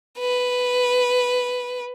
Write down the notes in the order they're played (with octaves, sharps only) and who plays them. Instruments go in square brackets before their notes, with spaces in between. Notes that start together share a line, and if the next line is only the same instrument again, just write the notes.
[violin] B4